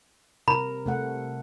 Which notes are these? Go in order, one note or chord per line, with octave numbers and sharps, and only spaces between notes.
C3 A#4 A#5 B5
C3 A3 F#5